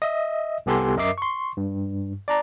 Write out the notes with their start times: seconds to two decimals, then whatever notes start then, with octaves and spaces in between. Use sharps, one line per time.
0.02 D#5 E5
0.66 C2 B3 G4 A4 G#5 C6
0.96 F#2 A#4 D#5 E5 D6 C7
1.18 C6 C#6
1.57 G2
2.28 D5 A5 A#5